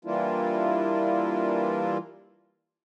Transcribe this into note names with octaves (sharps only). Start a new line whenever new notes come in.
E3 G3 A#3 D4 E4 F4